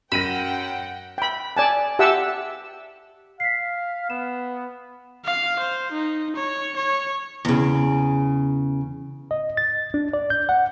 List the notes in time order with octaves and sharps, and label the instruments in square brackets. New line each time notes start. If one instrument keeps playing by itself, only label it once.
[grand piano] F#2 [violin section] F#5 G5 [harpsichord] B5 [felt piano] A#6 D#7 E7
[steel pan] G5 B5
D5 G#5 A5
G4 E5 F#5 G5 A5 E6
[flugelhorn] F5 [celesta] B6 C7
[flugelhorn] B3 [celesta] E7
[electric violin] F5 C7
C5
D#4
C#5
C#5
[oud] E2 C#3
[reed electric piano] D#5
A6
D4
D5
G6
F#5